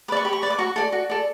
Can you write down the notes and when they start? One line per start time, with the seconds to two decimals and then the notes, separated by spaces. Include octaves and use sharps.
0.08 B4 D5 D6
0.17 C#6
0.25 G4 B5
0.33 C#6
0.42 B4 D5
0.50 D6
0.59 F#4 C#6
0.76 A4 D5
0.92 F#4
1.10 A4 D5